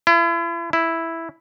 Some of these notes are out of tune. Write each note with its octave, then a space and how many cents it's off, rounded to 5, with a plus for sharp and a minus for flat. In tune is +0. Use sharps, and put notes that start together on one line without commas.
E4 +40
E4 +0